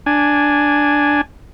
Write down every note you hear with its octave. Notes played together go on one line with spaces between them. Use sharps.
D4 G#5